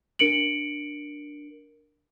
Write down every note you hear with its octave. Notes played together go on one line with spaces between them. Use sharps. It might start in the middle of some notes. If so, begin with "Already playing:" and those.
D4 A#4 C#7 D7 F#7